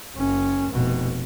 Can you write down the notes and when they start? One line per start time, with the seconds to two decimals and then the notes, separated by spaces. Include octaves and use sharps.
0.16 F#1 C#4
0.73 F1 B2